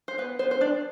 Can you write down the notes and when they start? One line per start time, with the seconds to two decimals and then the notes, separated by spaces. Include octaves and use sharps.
0.08 C5
0.18 B3 B4
0.39 B3 C5
0.51 C5
0.61 D4 D5